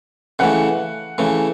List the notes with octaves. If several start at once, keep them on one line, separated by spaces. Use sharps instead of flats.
C#3 E3 A3 F#5
C#3 E3 A3